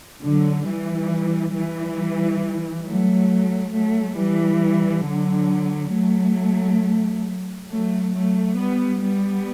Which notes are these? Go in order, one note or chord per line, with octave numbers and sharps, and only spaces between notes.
D3 F#3
E3 G3
E3 G3
F#3 A3
F#3 A3
E3 G3
D3 F#3
F#3 A3
F#3 A3
F#3 A3
G3 B3
G3 B3